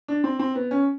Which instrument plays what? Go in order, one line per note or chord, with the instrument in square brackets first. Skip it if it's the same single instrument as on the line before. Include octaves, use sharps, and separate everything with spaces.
[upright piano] D4
C4
C4
B3
C#4